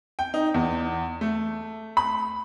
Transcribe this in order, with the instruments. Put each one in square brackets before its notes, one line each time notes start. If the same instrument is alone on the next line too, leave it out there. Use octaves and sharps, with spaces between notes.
[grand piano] G5
D#4
E2
A3
B5